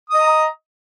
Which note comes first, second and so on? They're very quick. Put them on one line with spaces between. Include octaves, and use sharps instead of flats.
D#6 D#5 A#5